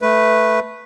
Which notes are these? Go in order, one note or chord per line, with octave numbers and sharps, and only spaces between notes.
A3 B4